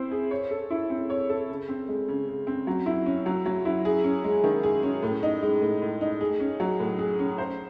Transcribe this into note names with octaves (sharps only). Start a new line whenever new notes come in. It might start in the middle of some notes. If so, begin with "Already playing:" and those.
Already playing: C4 E4 C5
G#4
C#5
A4
E4
C4
C#5
A4
C#3
C4
G#3
C#3
C#3
C4
F#3
E4
C#4
F#3
F#3
E4
G#4
C#4
G#3
D#3
G#4
C#4
A2
D#4
G#3
A2
A2
D#4
G#4
C#4
F#3
A2
G#4
C#4
C5